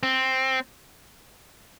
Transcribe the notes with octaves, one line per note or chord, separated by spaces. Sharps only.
C4